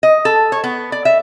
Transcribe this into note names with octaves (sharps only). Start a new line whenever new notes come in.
D#5
A4
C#5
B3
D5
E5